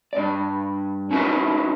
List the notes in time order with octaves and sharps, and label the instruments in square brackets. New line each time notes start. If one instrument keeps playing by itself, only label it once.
[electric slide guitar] G2 D5
C#4 D#4 E4 F#4 A#4 B4